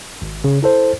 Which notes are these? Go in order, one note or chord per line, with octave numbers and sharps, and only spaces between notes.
G#1
C#3
E4 A4 C5